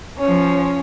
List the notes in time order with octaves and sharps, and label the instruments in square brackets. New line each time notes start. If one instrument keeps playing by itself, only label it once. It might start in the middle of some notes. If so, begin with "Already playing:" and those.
[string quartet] F3 C#4